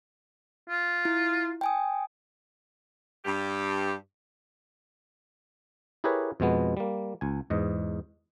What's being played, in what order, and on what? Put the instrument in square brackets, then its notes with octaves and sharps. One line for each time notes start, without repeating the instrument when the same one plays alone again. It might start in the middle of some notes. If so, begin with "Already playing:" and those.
[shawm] F4
[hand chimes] E4
G5 G#5 D#6
[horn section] G2 G4
[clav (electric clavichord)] E4 G4 G#4 A#4 B4 C#5
F2 B2 G#3 B3
G3 A#3
C#2 G#5
E2 G#2 D#5